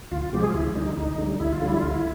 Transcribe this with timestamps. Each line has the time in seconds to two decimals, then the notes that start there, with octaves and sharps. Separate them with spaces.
0.11 D2 F4
0.22 F4
0.33 C3 F3 G#3 G4
0.43 G#4
0.50 F4
0.54 D2 E4
0.75 D3 G3 D#4
0.97 D2 D#4
1.18 D3 G3
1.40 D2 E4
1.53 F4
1.62 D3 G3 E4
1.78 D2 F4
1.90 E4